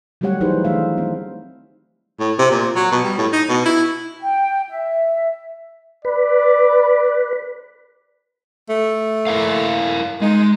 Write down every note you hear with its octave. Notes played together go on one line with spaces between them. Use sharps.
F#3 G3 A3 G4 C#5 F#5
E3 D#4 E4 G#4 B4 C5
D#3 E3 A3 D4 E5 F5
C4
A2
C3
A#2
F#3
B2
G3
A2
D#4
B2
E4
G5
E5
B4 D5
A3
E4 A#4 F5
G#3 D#4